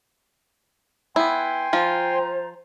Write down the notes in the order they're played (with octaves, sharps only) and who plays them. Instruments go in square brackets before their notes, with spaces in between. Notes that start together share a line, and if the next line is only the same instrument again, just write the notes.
[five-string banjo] B3 E4 [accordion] G5 G#5 C6
[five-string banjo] F3 F4 [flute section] C5 A#5